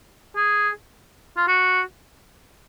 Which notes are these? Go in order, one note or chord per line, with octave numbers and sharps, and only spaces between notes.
G#4
F4
F#4